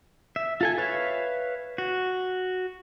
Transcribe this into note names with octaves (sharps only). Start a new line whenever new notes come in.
E5
F4 A4 G#5
B4 C#5 E5 F5
F#4